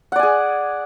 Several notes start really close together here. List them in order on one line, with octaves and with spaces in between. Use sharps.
F#5 D5 G#5 G#4